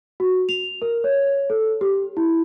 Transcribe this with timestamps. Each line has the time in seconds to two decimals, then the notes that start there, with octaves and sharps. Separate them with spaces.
0.20 F#4
0.49 F7
0.82 A#4
1.04 C#5
1.50 A4
1.81 G4
2.17 E4